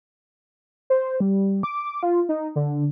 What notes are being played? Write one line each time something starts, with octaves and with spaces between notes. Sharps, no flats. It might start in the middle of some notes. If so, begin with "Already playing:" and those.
C5
G3
D6
F4
D#4
D3